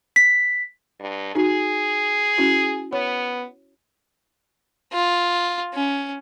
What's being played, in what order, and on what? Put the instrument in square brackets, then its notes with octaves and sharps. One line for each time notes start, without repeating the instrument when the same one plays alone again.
[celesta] B6
[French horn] G2
[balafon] D#4 F#4 [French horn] G#4
[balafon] C#4 E4 F#4
[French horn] B3 [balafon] C#5
[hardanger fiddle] F4
C#4